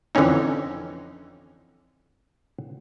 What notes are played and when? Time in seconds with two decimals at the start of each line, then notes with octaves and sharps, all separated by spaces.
0.15 F2 D3 E3 C4 C#4 D#4